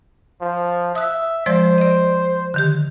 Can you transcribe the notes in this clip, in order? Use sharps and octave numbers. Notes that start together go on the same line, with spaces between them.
F3
E5 D#6 F#6
F3 G#3 C5 D5
D5 D#5
D3 D#3 G4